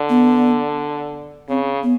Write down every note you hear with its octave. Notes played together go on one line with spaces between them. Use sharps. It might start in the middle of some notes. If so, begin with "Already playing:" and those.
Already playing: D3
B3
C#3 C4
B3